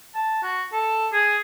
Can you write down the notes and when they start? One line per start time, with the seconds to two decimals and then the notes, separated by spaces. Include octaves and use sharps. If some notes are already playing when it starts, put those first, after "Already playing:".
0.15 A5
0.43 F#4
0.73 A4
1.13 G#4